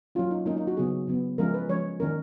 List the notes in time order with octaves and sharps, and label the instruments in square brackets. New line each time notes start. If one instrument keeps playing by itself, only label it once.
[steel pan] F#3 A#3 C#4 F4
D#4
F#3 A#3 C#4 D#4
D#4
F#4
C#3 F#3 B3 G#4
C#3 F#3 B3
F3 G#3 C#4 A#4
B4
F3 G#3 C#4 C#5
D#3 A#3 C#4 A#4